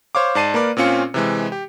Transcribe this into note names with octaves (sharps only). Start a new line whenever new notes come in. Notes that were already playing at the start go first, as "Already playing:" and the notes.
C5 C#5 F5 D6
G#2 D5 A5 C7 D#7
A#3 A#4 B4 D5
A#2 C4 C#4 F4 C#7
C3 E3 G#3
G4